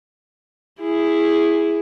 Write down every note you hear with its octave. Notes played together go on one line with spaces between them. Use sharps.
E4 G#4